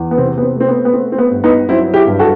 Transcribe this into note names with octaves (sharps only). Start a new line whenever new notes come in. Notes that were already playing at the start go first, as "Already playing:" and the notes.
Already playing: E2
B3
C3 C4
B3
C4
A3
C4
B3
B3
A3 C4
C4
B3
G2
B3 D#4
F#3 C4 E4
E4 G4
G2
F#4 A4